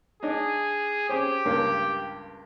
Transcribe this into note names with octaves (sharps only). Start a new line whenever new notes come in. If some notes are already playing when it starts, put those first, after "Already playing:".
D4 D#4 G#4
C4 C#4 G4 G#4
C#2 G2 A#3